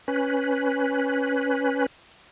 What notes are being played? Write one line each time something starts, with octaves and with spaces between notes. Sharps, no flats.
C#4 B4